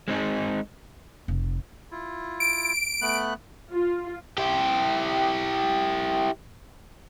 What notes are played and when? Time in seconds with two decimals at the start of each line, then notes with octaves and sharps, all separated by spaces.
0.08 G#3 C4 D#4 G#4
1.28 F1
1.91 E4 F4
2.40 D7
3.02 A3 B3 F#6
3.71 F4
4.38 E4 G4